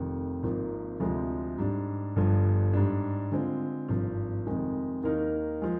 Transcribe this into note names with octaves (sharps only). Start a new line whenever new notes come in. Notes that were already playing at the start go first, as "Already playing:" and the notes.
Already playing: F1 F2 D#3
G#1 G#2 F3 A#3
D2 C3 F3 G#3
G#2 G3 D4
G1 G2 F3
G#2 G3 D4
D3 G#3 C4 F4
G#1 G2 F3
F2 C3 D#3 G#3
D#2 D#3 A#3 D#4 A#4
F3 G#3